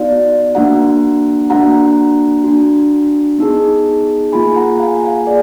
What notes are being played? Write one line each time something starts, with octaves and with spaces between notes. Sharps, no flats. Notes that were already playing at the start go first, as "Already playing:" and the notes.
Already playing: B3 D#4 F#4 D5 F5
A#3 D4 F#4 F#5 A#5
A#3 D4 F#4 F#5 A#5
D4 F#4
B3 D#4 G#4
A#3 F4 G#4 G#5 B5
F#5 A#5
F5 G#5
F5 G#5
G#4 D5